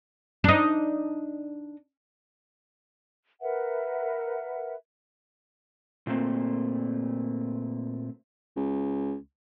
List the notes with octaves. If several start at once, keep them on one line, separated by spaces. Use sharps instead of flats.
D4 D#4
A#4 B4 E5 F#5
A#2 A3 A#3 C4
C#2